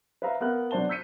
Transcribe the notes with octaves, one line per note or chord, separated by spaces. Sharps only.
B4 C5 E5 F5 A#5
B3 A#4 F5 F#6
B2 F#3 D4 C5 A5 G7
E6 G6 B6 C#7 D#7